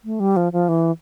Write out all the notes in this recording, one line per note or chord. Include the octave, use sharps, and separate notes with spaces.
A3
G3
F3
F3
E3